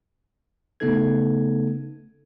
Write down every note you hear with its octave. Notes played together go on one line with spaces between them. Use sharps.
C#3 A3 B3 D#4 A4 G#6